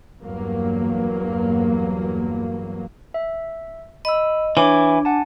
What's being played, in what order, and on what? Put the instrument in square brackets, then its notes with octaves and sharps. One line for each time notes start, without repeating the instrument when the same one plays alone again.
[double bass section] E2 G2 F#3 A#3
[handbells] E5
[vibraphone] D#5 [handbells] B5 E6
[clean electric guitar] E3 [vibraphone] D4 [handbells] C#5 D6
[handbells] F#5 G#5 A5